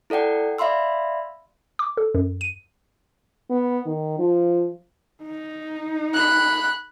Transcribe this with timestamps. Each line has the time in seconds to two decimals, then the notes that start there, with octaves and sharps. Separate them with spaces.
0.10 E4 A4 D5 F#5 G5
0.58 D5 E5 F5 B5 C6 E6
1.79 D6
1.97 A4
2.14 F#2
2.41 D#7
3.50 B3
3.86 D#3
4.19 F3
5.23 D#4
6.14 B5 F#6